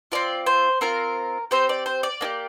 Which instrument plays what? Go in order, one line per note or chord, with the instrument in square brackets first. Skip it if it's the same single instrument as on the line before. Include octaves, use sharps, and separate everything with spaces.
[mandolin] C4 F4 D5
C5
C4 F4 A#4
C4 G4 C5
D5
C5
D5
A#3 D4 G4